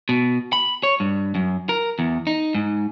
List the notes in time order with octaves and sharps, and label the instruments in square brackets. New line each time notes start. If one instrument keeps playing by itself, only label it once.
[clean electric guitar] B2
B5
C#5
G2
F#2
A#4
E2
D#4
G#2